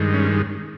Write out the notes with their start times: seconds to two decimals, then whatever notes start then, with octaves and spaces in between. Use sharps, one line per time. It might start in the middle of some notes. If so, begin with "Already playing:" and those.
Already playing: G2 D#3 G#3
0.14 C#4